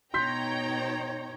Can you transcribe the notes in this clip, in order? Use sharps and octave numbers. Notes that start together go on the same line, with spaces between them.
B2 D#4 C#5 G5 A#5 C6 G6 B6